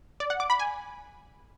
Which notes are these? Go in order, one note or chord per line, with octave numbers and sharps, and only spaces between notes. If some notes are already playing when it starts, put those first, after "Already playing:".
D5
F#5
D6
B5
G#5